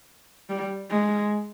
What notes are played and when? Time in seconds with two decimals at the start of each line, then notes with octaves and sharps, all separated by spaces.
0.49 G3
0.91 G#3